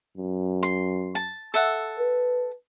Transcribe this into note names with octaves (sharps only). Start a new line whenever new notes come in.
F#2
C6
A5
A4 E5 F#5
B4